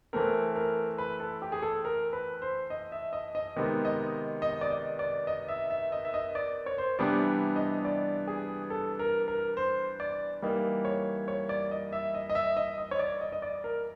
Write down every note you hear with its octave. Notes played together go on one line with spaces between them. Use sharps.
E3 A3 C4 A#4
A#4
B4
A4
G4
G#4
A4
A#4
B4
C5
D#5
E5
D#5
D#5
C3 D#3 G#3 B3 D#4
D#5
D#5
D5
D#5
D5
D#5
E5
E5
D#5
E5
D#5
D5
C#5
C5
C3 E3 G3 B3 D4 D5
D#5
D5
G#4
A4
A#4
A#4
C5
D5
E3 G3 A#3 D#4
C#5
C#5
D5
D#5
E5
D#5
D#5
E5
D#5
D#5
C#5
D5
D#5
D#5
D5
A#4